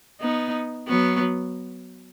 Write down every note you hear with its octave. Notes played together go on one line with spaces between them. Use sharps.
B3 D#4
F#3 B3